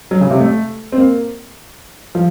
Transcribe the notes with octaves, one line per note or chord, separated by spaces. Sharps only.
F#3
C#3
C3
A3
C4
A#3
F3